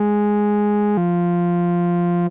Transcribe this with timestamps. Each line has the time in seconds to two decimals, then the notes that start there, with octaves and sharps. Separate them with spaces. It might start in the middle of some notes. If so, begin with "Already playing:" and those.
Already playing: G#3
0.97 F3